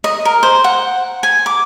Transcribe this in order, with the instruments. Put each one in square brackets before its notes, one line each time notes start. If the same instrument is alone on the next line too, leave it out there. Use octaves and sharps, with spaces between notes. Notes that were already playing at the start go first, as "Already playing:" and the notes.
[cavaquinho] D#5
A#4
C5
F#5
G#5
D6